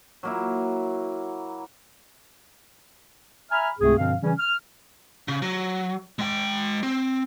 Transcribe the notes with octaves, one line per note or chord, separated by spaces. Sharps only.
F#3 A#3 E4
E5 G#5 A#5 B5 F6
C#2 G#2 C3 A3 C4 G#4
G2 B2 D3 F3 C4 F5
C#3 E3 G3 C#4
F6
C#3
F#3
G#3 G5
C4